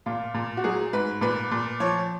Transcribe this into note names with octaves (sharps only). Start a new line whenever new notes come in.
A#2 F4
A#2
F#4
F#3 G#4
G#2 B4
A#2 B4
A#2
F3 C#5